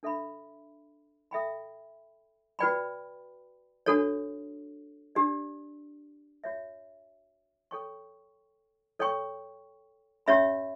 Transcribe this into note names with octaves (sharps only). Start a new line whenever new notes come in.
D4 A4 E5 B5
A4 E5 G5 B5
F#4 B4 D5 G5 B5
D4 F#4 A4 C#5
D4 G4 D5
F#4 C#5 E5
A4 C#5 G5 C#6
A4 C#5 G5 C#6
C#4 G4 C#5 E5 B5